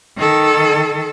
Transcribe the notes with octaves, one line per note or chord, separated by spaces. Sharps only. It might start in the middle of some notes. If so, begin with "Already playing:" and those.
D#3 A4